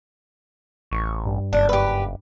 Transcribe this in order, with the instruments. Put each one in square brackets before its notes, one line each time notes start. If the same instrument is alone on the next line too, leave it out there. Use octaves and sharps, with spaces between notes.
[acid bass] A1 [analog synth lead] C#6
[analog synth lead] G2
[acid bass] F#1 [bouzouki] D4
[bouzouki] G4 B4